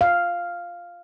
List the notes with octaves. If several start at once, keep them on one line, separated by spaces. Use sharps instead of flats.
F5